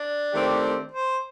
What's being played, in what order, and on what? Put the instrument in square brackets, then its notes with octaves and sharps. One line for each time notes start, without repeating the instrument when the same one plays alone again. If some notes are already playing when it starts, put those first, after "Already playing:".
Already playing: [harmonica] D4
[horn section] D#3 A3 C4 G4
[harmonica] C5